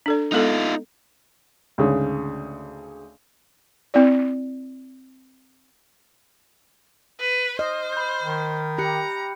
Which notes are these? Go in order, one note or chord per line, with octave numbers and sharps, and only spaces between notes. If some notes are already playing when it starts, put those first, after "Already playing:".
D4 A4 D5
G#3 B3 D#4 F4 A4
D2 G#2 C#3
C4 E4 D5
B4
C5 D#5 F6
B5 G6
D#3
G4 A#5 B5 F#6 C#7